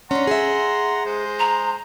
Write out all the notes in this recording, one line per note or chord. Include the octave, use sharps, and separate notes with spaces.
C#4 D4 F#5 A#5 C6
G#4 E5
G#3 C5
A#5